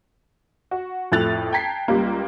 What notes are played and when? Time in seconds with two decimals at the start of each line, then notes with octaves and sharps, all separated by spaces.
0.71 F#4
1.12 F2 A2 A4 F#6 A6 F7
1.53 G5 A5 A#5 G#6 B6 C7
1.88 C#2 G3 A#3